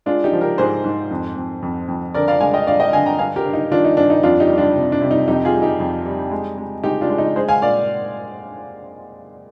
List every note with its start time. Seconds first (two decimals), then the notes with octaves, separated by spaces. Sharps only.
0.06 G#3 D4 F4
0.24 D#4 G4
0.33 F3
0.41 G4 A#4
0.58 G#2 G#4 C5
0.84 G#2
1.11 F2
1.37 F2
1.62 F2
1.88 F2
2.14 D3 A#4 D5
2.28 D5 F5
2.40 G#3 F5 G#5
2.54 D#5 G5
2.67 G2 D5 F5
2.80 D#5 G5
2.93 D3 F5 G#5
3.06 G5 A#5
3.19 G2 F5 G#5
3.36 G4 A#4
3.45 G2
3.53 D#4
3.71 D#3 D4 F4
3.85 D#4
3.97 G2 D4
4.10 D#4
4.23 F2 D4 F4
4.40 D#4 G4
4.50 G3
4.58 D4 F4
4.75 C3
4.92 D4
5.02 C3
5.11 D#4
5.28 F2 D#4 G4
5.45 F4 G#4
5.54 G3
5.62 D#4 G4
5.80 F2
6.06 G3
6.31 G#3
6.58 G#3
6.84 G#3 D#4 G4
7.01 D4 F4
7.10 G#3
7.18 D#4
7.36 G#3 G#4 C5
7.48 F5 G#5
7.62 A#2 D5 F5